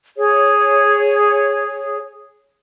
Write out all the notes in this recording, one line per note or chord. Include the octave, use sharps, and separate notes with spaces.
G#4 C#5